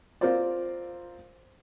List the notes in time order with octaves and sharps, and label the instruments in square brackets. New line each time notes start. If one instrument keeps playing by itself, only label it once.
[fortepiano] C4 F4 A#4 C5 D5